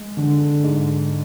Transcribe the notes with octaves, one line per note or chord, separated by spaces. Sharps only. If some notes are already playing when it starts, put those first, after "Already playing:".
Already playing: G#3
D3
G#2